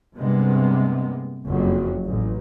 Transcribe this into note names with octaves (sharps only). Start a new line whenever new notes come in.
G2 C3 G#3 A#3 B3
F#1 F2 C#3 F#3
A1